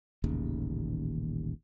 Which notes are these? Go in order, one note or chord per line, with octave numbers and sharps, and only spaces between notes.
D#1 A1 D#2 C#3